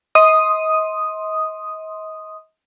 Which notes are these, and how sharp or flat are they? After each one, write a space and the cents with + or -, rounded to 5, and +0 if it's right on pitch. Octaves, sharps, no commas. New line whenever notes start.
D#5 +35 C6 +5 D#6 +0